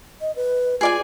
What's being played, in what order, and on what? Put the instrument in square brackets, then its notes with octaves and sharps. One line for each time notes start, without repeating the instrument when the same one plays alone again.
[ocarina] D#5
B4
[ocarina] F4 [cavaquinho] G#4 D5 G#5